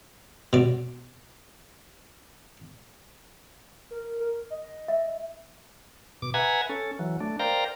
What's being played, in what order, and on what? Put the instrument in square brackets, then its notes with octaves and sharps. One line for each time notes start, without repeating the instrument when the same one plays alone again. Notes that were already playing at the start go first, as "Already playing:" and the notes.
[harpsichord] B2 D5
[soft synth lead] A#4
A#4
D#5
[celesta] E5
[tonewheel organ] B2 D6
B4 E5 F#5 G#5 A#5 G#6
C#4 A4
E3 F#3
A3 D4
A#4 C5 D5 F5 G5 A#5